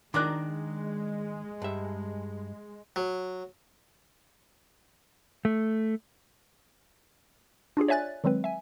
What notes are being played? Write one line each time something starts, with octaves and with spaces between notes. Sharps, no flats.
D#3 G#3 D4 A#4 D6 F#6
G2 E5
F#3
A3
D4 F4 G4 G#4
C#5 D5 E5 G#5 F#6 A6
D#3 F#3 G#3 C4 B4
E5 G#5